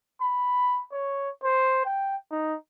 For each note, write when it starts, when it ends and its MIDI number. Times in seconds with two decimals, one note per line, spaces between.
0.22 0.83 83
0.92 1.30 73
1.44 1.82 72
1.86 2.17 79
2.32 2.55 63